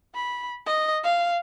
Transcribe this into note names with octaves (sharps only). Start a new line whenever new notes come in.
B5
D#5
F5